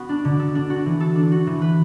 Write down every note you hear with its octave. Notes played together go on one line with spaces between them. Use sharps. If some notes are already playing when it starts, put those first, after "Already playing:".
Already playing: B3 F#4
D4
D3
A4
D4
F#4
E3
A4
D4
F#4
E3
B4